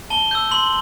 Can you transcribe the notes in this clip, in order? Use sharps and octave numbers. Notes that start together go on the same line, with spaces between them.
A5 G7
E6 G6
C6 F#7